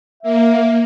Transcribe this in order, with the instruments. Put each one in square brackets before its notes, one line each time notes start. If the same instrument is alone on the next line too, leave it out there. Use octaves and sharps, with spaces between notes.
[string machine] A#3 [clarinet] E5